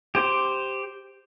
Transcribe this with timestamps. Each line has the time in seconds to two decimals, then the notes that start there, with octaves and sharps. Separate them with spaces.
0.15 G4 C5